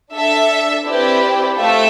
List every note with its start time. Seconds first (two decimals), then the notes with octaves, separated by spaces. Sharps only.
0.14 D4 A4 E5
0.85 C4 E4 G4 B4 D5
1.58 A3 C4 F4 A4 E5